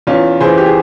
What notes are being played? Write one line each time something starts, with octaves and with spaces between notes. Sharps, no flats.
E2 C#4 F4
E3 G#4 C5
G4
G#4